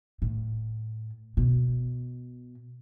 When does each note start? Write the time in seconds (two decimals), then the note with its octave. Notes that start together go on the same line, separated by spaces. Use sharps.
0.22 A2
1.37 B2